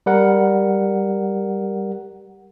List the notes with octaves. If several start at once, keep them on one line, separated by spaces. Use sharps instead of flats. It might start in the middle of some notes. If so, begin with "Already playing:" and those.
G3 A#4 F#5